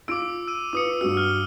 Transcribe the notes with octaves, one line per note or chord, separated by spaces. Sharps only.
F4 D6 E6 D7
E6 D#7
F4 B4 D6 D#6 C#7
G2 F#4 E6
F6 G7